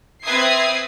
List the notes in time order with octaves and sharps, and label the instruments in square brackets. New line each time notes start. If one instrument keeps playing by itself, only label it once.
[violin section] C4 B4 E5 D#6 G#6 C7